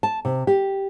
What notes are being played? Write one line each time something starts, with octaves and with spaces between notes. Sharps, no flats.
A5
C3
G4